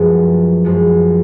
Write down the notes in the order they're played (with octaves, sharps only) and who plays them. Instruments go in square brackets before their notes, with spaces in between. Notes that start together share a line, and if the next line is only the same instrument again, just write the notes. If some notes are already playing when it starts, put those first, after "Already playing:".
Already playing: [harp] F#2 F3 G#3 B3
F#2 F3 G#3 B3